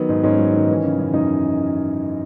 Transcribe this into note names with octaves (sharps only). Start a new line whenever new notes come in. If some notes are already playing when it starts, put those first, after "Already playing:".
Already playing: D#3 F#3 B3
G#2
G#2 C#4
F#3
D#3
E3
C#3
F#2
F#2 D#4